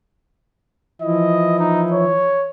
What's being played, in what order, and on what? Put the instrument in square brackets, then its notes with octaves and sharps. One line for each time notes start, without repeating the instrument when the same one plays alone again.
[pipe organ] E3 F3 E4 [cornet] D#5
[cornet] D#4
C#5